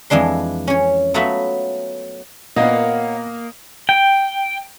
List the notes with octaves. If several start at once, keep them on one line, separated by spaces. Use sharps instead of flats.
F2 E3 G#3 D4 C6
C#4 C#5
F#3 A3 B3 F4 F#4 E5
A#2 A#3 B3 C#5 D#5 F5 F#5
G5